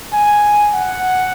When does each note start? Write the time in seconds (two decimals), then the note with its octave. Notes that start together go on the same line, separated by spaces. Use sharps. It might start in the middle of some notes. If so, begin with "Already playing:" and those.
0.13 G#5
0.74 F#5